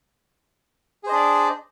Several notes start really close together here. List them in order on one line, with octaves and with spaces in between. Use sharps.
G#4 C5 D#5 D4 D5